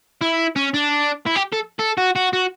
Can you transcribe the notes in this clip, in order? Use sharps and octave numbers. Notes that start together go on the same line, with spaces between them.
E4
C#4
D4
E4
G4
A4
A4
F#4
F#4
F#4